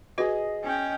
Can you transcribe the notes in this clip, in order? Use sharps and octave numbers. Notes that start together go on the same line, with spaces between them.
F#4 G#4 B4 D#5
C#4 G5